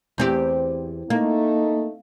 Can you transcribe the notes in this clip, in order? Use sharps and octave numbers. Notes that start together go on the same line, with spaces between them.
E2 C4 G4
A3 A#3 D#4